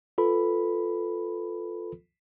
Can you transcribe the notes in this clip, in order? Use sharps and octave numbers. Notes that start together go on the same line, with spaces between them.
F4 A4 B4 B5